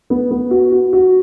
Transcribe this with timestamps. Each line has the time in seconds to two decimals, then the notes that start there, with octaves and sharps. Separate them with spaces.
0.10 B3
0.31 B3
0.51 F#4
0.72 F#4
0.93 F#4